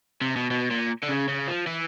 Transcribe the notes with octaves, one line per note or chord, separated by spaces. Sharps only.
C3
B2
B2
A#2
D3
C#3
C#3
F3
E3